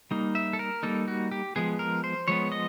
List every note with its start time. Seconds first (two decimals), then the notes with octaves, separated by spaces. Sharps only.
0.11 G3 A#3 D#4
0.35 E5
0.53 A4
0.59 A#4
0.83 G3 A#3 D#4 A4
1.08 F#4
1.32 G4
1.56 F3 G#3 B3 G#4
1.79 A#4
2.04 C5
2.28 F3 G#3 B3 C#5
2.52 D#5